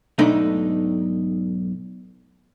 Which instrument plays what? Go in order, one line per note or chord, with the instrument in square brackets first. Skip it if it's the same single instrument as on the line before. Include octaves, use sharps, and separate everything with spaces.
[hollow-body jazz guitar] B1 G#2 A3 D4 D#4